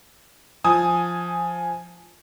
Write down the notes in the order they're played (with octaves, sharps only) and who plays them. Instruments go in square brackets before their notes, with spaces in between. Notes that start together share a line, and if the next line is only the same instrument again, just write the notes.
[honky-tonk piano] F3 G#5 D#6